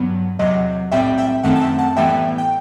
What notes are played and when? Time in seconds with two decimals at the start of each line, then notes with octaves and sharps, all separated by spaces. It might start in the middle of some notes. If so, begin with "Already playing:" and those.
Already playing: G2 F#3 B3
0.39 E2 C3 F#3 D#5 F#5
0.91 B1 A2 G3 C4 E5 G5
1.18 E5 G5
1.43 F#2 D#3 A3 C4 F#5 A5
1.56 A5
1.61 E5 G5
1.78 F#5 A5
1.96 A1 A2 E3 G3 B3 E5 G5
2.38 G5